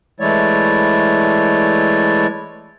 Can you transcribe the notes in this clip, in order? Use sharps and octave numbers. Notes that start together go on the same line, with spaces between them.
E3 G#3 A3 E4 C#5 D5